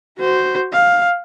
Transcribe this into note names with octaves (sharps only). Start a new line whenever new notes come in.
F#4 C5
F5